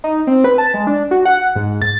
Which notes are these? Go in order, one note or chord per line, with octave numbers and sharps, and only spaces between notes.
D#4
C4
B4
A5
G#3
D4
F#4
F#5
G#2
A6